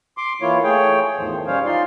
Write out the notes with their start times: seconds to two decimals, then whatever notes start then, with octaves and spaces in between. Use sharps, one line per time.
0.17 C6 D6
0.42 E3 A#3 E4 F4 C#5
0.64 A3 G#4 C#5 G5
1.18 E2 A2 D#3 F3 C5
1.47 G3 C#4 C5 C#5 F5
1.65 D#4 F4 D5 C6